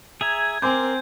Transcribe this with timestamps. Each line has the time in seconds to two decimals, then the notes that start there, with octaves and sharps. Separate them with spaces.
0.21 G#4 E5 A#5 G#6
0.62 C4 A#4 G#5 C6 D6 G6